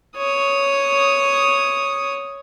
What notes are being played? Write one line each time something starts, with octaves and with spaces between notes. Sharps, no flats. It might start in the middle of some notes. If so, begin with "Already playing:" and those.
C#5 D#6